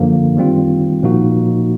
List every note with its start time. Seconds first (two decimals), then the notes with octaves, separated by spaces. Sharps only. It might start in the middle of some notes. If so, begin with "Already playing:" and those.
Already playing: F#2 D3 F3 A#3
0.37 D#3 G3 C4 F4
1.03 A#2 F3 A#3 D#4 F#4